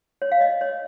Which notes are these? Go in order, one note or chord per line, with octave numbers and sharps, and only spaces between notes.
C#5
F5
D#5
C#5